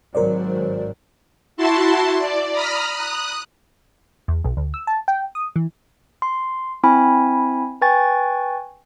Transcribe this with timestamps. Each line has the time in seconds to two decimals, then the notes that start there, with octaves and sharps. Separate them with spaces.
0.15 G#1 F#3 A#4 C5 D5
1.57 E4 F#4 A5 C6
2.18 D5
2.53 A#5 B5 D#6 F6
2.91 D#6 F#6
4.28 E2
4.44 B1
4.57 D2
4.74 E6
4.87 A5
5.08 G5
5.35 D#6
5.56 E3
6.22 C6
6.83 C4 E4 G#5 B5
7.82 B4 G5 G#5 C#6 A6